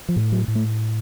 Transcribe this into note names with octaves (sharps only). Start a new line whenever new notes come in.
F3
A2
F#3
A2
A3